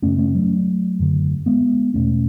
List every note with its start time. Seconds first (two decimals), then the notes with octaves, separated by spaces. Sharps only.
0.02 F#2 C#3 A3 C#4
0.18 A3 C#4
0.35 F#3 A3
0.99 F#2 D3
1.46 G#3 B3
1.94 E2 B2 A3 C#4